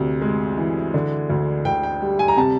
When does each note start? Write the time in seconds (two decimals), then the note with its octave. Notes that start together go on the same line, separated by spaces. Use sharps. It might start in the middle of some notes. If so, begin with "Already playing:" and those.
Already playing: D2 C3
0.22 G#3
0.57 E3
0.94 D3
1.30 D2
1.65 D2 G5
1.83 G5
2.02 G3
2.19 G#5
2.28 A#5
2.37 C3 A5